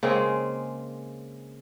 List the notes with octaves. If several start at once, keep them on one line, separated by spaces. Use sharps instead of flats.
C#3 G#3 A#3 C4